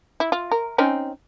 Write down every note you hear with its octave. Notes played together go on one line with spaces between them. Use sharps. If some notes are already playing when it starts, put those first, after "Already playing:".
E4
F4
A#4
C4 C#4 D#4